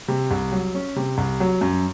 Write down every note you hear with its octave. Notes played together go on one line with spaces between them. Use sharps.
C3
C2
F#3
C#4
C3
C2
F#3
F#2